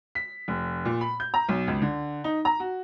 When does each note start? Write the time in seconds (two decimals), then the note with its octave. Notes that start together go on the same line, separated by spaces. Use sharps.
0.15 B6
0.48 F1
0.85 A#2
1.01 B5
1.20 G6
1.34 A#5
1.49 B1
1.67 C#2
1.82 D3
2.24 D#4
2.45 A#5
2.60 F#4